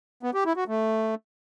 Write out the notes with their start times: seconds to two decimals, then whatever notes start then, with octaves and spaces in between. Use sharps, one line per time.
0.23 B3
0.34 G4
0.45 E4
0.57 F#4
0.68 A3